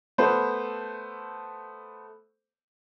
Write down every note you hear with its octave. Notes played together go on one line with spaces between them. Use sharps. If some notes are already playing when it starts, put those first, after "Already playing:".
A3 B3 C5